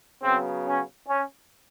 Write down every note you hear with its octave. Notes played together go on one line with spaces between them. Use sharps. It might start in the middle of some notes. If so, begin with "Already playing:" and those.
C#3 F#3 B3 C4
C#4
C#4